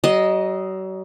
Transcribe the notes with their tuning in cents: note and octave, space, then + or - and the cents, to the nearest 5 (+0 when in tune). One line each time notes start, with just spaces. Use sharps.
F#3 +40 D#5 +0